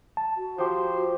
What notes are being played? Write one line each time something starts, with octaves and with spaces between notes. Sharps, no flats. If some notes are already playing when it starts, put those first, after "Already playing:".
A5
F#4
F3 G4 C5